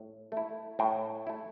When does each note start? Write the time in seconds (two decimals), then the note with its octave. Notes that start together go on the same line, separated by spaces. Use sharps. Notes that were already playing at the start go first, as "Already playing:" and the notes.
Already playing: A2
0.32 A3 E4
0.79 A2 G5
1.27 A3 E4